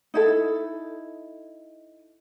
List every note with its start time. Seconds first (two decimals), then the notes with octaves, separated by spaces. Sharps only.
0.14 D#4 E4 A4